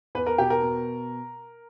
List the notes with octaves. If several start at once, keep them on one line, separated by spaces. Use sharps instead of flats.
E2 B4
A#4
B2 G4
A#4
B2